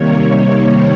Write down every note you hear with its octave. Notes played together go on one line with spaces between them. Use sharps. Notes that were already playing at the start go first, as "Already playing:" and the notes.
Already playing: C3 D#3 G3 A#3 C#5